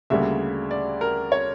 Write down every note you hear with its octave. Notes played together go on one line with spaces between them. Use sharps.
D2 C#3 G3 A#3 E5
D5
A#4
C#5